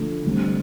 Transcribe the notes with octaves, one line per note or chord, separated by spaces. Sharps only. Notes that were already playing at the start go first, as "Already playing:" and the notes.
Already playing: D3 F3 A3
D3 G3 C4